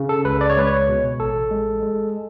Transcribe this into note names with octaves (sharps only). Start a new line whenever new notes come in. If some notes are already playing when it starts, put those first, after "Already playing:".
Already playing: C#3
A4
C#2 B4
D5
C#5
G#3 B4
C#5
B2
A1 A4
G#3
G#3